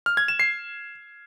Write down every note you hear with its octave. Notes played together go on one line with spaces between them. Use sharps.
F6
G#6
E7
C7